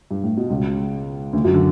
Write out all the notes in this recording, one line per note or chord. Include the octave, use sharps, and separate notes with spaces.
G2
A2
B2
C#2 C#3
D2 D3
F#2 F#3
D3